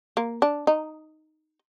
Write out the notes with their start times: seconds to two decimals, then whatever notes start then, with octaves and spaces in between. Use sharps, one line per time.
0.17 A#3
0.42 D4
0.67 D#4